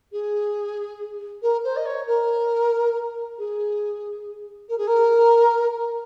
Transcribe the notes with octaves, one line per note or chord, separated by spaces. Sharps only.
G#4
A#4
C5
D#5
C#5
A#4
G#4
A#4
G#4
A#4